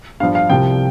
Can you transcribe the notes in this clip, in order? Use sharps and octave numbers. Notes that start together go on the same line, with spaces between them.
G2 F3 F5
F5
C2 C3 F3 G5